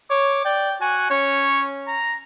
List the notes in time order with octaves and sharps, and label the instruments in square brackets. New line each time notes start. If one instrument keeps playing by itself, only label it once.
[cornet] C#5 [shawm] D6
[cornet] D5 [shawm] G5
[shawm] F#4 [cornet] G#5
[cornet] C#4 [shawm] C#5
[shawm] A#5